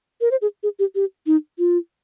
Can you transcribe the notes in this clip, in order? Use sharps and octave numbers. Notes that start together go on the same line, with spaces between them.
A#4
C5
G#4
G#4
G4
G4
D#4
F4